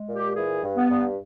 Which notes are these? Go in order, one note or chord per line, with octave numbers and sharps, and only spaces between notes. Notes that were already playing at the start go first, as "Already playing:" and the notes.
Already playing: G#3
A#2
G4
E3 G#4
G2
B3
G2